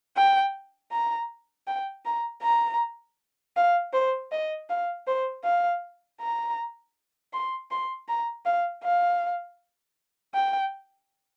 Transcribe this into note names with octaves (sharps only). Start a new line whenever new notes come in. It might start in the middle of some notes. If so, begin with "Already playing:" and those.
G5
A#5
G5
A#5
A#5
F5
C5
D#5
F5
C5
F5
A#5
C6
C6
A#5
F5
F5
G5